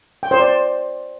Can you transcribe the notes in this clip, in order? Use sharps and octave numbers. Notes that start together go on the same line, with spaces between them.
G5
C5
D5